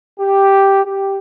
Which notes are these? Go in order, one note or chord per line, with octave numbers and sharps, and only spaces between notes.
G4
G4